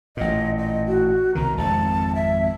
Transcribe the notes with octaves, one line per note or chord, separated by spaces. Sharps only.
A1 A#2 D#5
D#5
F#4
C2 B2 D#3 A#5
G#1 F2 F3 A5
E5